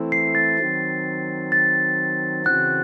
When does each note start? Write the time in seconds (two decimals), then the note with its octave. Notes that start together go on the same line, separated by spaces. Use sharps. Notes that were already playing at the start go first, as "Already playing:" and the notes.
Already playing: E3 A3 C4 E4
0.12 C7
0.35 A6
0.58 D#3 F#3 C4
1.52 A6
2.46 C#3 E3 C4 F#4 F#6